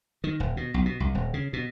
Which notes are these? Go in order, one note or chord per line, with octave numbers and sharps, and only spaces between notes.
D#3
D#1
B2
B1
B2
C2
D#1
C#3
B2